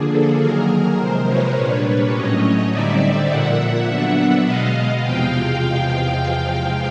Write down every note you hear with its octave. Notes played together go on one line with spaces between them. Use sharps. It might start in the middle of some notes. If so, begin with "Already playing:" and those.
Already playing: D3 F3 A#3 D4 G#4
A4
D#3 F#3 A#3 G#4 A#4
C3 F3 G#3 A#4 C5
B4 C#5
A#2 G3 A#3 D4
A2 F#3 A3 C#4 C#5 D#5
D3 G3 C4 D#4 D5 E5
A#2 F3 A#3 E5 F#5
D3 F#3 B3 D4
B2 G#3 B3 D#5 F5
E2 C3 F3 G#3 F5 G5